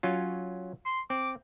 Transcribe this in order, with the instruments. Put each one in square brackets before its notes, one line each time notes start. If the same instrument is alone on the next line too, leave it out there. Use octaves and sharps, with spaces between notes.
[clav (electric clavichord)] F#3 C#4 F4
[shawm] C6
[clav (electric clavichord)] C4 [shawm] D6